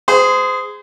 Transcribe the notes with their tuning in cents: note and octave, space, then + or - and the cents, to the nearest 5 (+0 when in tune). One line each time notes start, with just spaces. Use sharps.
G#4 +0 C5 -30